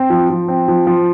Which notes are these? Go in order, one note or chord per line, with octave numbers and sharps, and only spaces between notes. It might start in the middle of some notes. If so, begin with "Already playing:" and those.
Already playing: C4
F3
F3
C4
F3
F3